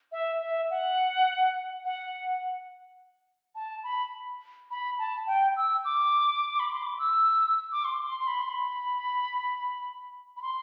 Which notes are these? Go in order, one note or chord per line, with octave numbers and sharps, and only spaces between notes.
E5
E5
F#5
F#5
A5
B5
B5
A5
G5
E6
D6
B5
C6
D6
E6
D6
C6
C6
C6
B5
C6
B5
B5
C6